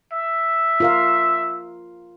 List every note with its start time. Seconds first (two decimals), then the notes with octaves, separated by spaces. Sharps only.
0.13 E5
0.80 F4 A#4 F5